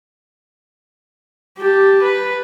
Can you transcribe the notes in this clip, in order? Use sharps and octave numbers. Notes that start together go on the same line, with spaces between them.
G4 A5
B4